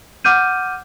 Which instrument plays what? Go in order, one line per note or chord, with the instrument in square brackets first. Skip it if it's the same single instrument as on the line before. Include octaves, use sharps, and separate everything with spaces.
[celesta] F#5 D6 F6 G6 D#7